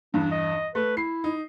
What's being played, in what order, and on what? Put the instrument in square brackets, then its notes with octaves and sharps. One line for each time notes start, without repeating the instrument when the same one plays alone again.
[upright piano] E2 G2 [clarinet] D4
[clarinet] D#5
[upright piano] A3 [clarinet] B4
[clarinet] E4 [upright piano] C7
[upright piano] D#4